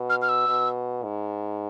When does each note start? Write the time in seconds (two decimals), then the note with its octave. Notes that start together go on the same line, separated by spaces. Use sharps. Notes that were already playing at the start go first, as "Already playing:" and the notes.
Already playing: B2
0.10 F6
0.22 F6
0.29 E6
0.48 B2
1.04 G#2